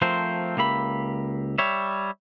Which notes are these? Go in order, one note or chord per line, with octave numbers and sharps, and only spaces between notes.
F3 A3 C4 A#4 C5
C#2 A#3 G4 E5 B5
G3 C#5 E5